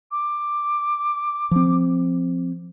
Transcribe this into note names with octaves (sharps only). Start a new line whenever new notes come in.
D6
F3 C4